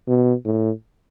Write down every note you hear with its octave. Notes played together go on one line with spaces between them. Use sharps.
B2
A2